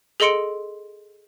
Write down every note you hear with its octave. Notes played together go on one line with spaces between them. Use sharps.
G#4 A4 D#5 C6 C#7 D7